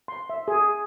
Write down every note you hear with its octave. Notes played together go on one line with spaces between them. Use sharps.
C6
E5
G#4